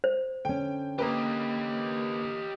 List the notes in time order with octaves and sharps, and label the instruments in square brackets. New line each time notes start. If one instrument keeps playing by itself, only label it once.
[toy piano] C5
[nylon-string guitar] D3 C#4 [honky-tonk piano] G5
[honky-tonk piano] A#3 A#4 B4 [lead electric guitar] G4 D#5